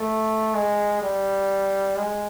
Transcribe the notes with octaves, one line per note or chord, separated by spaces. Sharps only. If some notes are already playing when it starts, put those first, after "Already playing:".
Already playing: A3
G#3
G3
G#3